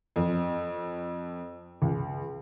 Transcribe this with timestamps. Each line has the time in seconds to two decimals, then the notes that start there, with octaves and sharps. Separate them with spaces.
0.16 F2
1.82 C#2